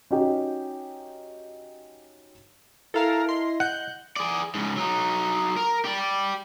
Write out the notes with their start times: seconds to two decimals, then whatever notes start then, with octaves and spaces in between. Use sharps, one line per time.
0.11 C#4 D#4 F#4 G4
2.94 E4 A4 A#4 F5 A5
3.29 D#5 C6
3.60 F#5 F#6 G6
4.16 G#4 D5
4.55 G#2 C#3
4.77 F#3 D#4
5.57 A#4
5.85 G4 D5